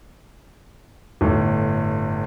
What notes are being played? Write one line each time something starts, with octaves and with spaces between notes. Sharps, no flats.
G1 A2